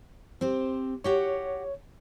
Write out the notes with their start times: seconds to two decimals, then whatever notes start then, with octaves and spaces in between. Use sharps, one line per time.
0.41 C4 G4 C5
1.04 F#4 G4 C#5 F#5